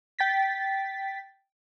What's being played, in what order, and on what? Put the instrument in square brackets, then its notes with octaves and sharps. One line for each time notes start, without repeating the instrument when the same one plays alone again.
[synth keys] G5 A6 B6